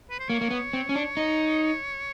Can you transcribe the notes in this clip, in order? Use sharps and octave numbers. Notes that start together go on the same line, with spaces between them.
B4
C5
A#3 C#5
A#3
B3
C4
C#4
D4
D#4